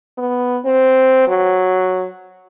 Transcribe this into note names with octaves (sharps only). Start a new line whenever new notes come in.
B3
C4
F#3